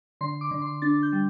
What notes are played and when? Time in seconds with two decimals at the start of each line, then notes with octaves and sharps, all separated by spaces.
0.21 D3 C6
0.41 D6
0.51 D3
0.62 C6
0.82 D4 A6
1.03 G6
1.13 G3